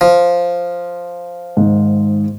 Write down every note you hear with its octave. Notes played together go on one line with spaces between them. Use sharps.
F3
G#2 D#3